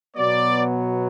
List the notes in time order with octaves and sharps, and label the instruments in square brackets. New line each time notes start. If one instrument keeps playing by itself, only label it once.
[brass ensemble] B2 F#3 B3 D5